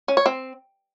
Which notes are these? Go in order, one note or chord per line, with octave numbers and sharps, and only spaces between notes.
C#4
C#5
C4